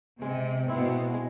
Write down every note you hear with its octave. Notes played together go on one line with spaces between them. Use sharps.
C3 G#3
B2 C4 E4
G#3